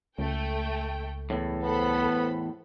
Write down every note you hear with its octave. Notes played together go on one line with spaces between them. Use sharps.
C#2 A3 G5
E2 A2
B3 A4 C5 B5